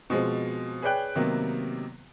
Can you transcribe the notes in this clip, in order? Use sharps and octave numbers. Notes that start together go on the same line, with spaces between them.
B2 F3 G#3 C4
G#4 B4 C#5 D5 G5 F#6
C3 D#3 F#3 A#3 B3